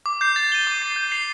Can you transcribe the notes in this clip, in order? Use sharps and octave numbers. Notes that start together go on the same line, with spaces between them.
D6
G6 C7
A6
D#7 G7
D6
A6 C7
G6
C7 F7